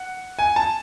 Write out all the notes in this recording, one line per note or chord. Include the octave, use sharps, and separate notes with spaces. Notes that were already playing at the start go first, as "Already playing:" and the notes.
Already playing: F#5
G#5
A5